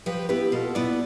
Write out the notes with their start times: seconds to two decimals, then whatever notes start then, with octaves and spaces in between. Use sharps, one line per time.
0.06 F3 G4 B4
0.29 B3 E4 G4 B4
0.52 B2 F4 A4
0.75 B3 E4 B4 D5